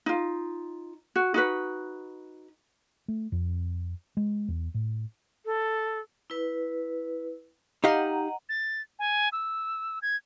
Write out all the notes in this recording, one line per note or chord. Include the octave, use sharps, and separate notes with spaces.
D#4 F4
F#4
D#4 F#4 B4
A3
F2
G#3
E2
A2
A4
E4 B4
D#4 G4 D#5 F5 F#5 A#5
A6
G#5
E6
G#6